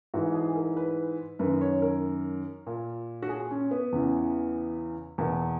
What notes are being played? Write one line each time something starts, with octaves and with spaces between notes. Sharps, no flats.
G#2 E3 F#4
G#4
A#4
B4
F#2 D#3 B4
C#5
A#4
A#2
F#4
G#4
C#4
B3
E2 C#3 E3
E2 B2 A#3